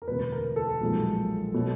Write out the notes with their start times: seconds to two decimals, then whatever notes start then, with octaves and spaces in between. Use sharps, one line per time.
0.02 A#4
0.08 E1 D2 C3 B4
0.32 A#4
0.56 A4
0.81 B1 A#2 F3 G#3
1.54 B2 F#3 A3